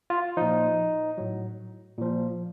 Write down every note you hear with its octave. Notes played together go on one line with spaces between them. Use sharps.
F4
A#2 F3 D#4
A2 F#3
A#2 F3